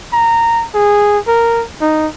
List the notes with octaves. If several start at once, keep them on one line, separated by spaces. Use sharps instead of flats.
A#5
G#4
A#4
D#4